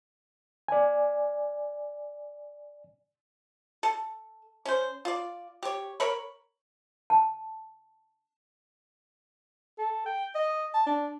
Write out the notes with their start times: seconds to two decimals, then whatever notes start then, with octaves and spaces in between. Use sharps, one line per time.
0.68 D5 G#5
3.83 A4
4.65 C#4 C5
5.05 F4 D5
5.63 G4 C#5
6.00 A#4 C#5 B5
7.10 A5
9.79 A4
10.06 G5
10.35 D#5
10.74 A5
10.86 D4